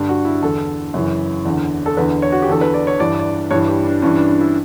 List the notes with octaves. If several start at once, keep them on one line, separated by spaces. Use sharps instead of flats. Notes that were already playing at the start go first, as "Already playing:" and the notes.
Already playing: G2 D3
F#4
E4
E2 D3 A4
F#2 C#3 E3
E2 D3
A4
E2 D3 B4
C#5
F#4
G4
E2 D3 A4
B4
D5
C#5
G2 E3 D5
D5
G2 E3 C#5
G4
D4
G2 E3 C#4
D4
D4
E4